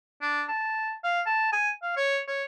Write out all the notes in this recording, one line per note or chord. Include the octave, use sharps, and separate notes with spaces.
D4
A5
F5
A5
G#5
F5
C#5
C#5